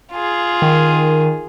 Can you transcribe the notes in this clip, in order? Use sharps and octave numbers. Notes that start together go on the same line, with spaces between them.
F4 G#4
D#3